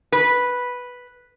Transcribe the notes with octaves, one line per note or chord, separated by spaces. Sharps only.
B4